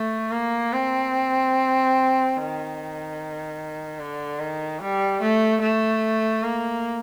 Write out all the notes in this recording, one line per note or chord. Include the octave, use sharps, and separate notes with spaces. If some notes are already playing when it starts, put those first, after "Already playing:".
Already playing: A3
A#3
C4
D#3
D3
D#3
G3
A3
A3
A#3